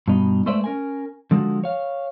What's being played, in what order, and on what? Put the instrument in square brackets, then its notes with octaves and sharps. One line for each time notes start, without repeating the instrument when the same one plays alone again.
[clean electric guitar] G2 B2 D#4
G#3 A3 B4 C5 D5 E5
C#4 A#4 G#5
D3 F3 G#3 F#4
C#5 F5